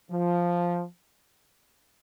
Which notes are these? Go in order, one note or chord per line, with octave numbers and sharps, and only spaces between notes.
F3